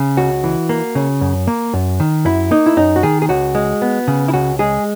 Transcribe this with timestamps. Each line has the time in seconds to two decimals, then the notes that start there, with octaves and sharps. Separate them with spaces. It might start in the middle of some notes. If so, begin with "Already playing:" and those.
Already playing: C#3
0.17 C#2 F#4
0.44 E3
0.69 A#3
0.95 C#3
1.21 F#2
1.47 A#3
1.74 F#2
2.00 D#3
2.25 F#2 E4
2.51 A#3 D#4
2.66 E4
2.77 F#2 D#4
2.96 F#4
3.03 D#3 G#4
3.22 G#4
3.29 C#2 F#4
3.55 G#3
3.82 B3
4.08 C#3
4.28 E4
4.33 C#2 F#4
4.59 G#3 G#4